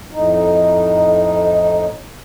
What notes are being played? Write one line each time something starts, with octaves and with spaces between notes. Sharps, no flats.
F2 A2 D#4